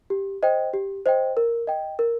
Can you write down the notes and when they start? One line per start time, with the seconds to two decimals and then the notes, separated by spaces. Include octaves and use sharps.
0.10 G4
0.43 C5 D#5 G5
0.74 G4
1.06 C5 D#5 G5
1.37 A#4
1.67 D#5 G5
1.99 A#4